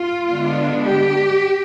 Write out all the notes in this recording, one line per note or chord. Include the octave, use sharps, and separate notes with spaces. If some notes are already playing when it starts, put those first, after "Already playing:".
Already playing: F4
D3 G#3 B3 D4
G4